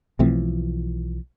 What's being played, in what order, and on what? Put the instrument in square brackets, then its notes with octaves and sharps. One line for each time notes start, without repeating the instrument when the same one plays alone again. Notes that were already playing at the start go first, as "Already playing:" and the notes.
[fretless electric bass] B1 E3 F3 [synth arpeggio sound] B2 A3 C4